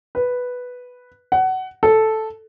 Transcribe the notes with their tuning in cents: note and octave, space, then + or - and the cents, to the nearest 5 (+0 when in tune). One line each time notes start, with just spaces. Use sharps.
B4 +0
F#5 +20
A4 -5